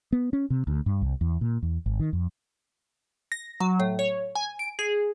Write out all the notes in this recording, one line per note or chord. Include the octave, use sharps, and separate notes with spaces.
B3
C#4
C3
D2
G2
C2
E2
A#2
E2
G#1
D#3
F2
A#6
F#3
A2
C#5
G#5
D7
G#4